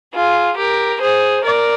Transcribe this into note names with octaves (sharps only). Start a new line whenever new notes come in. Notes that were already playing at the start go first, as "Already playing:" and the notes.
F4 G#4
G4 A#4
G#4 C5
A#4 D5